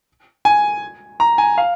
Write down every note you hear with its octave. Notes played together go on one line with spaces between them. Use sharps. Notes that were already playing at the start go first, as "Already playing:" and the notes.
G#5
A#5
G#5
F5